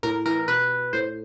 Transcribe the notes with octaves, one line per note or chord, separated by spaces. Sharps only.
A2 A#4
E3 A#4
B2 B4
A2 C5